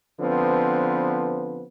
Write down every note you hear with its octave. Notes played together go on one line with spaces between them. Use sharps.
D3 F3 B3 C4 B4